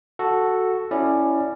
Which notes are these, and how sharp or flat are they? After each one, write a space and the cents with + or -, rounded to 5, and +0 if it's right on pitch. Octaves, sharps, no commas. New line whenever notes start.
F#4 +0 A4 +0
C#4 +0 E4 +0 D5 +15